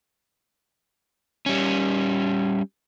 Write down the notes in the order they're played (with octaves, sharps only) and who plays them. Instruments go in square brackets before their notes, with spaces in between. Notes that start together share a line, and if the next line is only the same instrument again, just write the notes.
[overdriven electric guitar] G3 C#4